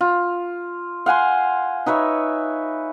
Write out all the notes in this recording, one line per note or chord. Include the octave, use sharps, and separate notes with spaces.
F4
F5 F#5 G#5 C6
D#4 B4 C#5 E5